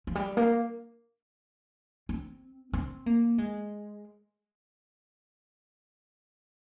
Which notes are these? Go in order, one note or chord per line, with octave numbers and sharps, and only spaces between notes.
F3
G3
A#3
C4
C4
A#3
G#3